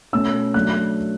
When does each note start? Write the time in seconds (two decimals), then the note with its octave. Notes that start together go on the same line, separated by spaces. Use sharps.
0.13 B2 A3 C#4 E6
0.54 F#3 A3 D4 F#6